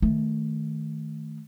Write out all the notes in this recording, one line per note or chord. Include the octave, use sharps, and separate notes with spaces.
D#3 A3